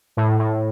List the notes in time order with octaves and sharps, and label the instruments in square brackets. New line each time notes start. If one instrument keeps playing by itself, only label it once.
[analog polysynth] A2
A2